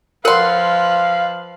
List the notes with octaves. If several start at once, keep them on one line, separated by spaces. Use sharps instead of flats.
F3 A#4 B4 C#5 F5 F#5 C6